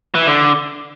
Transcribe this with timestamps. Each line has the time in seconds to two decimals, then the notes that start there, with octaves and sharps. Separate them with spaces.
0.15 E3
0.27 D3